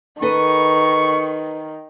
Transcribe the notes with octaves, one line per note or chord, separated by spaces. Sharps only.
D#3 A4 B4 D#5 C#6